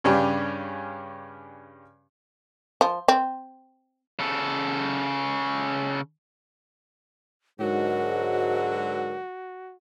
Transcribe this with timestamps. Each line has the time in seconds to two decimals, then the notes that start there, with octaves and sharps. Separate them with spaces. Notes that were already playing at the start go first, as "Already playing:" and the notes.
0.04 G2 C#3 C#4 D4 G4
2.81 F3
3.08 C4
4.19 C#3 A4
7.60 G#2 D3 F#3 F#4 A#4